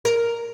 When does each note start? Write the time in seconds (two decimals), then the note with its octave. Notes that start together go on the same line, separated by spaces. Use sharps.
0.05 A#4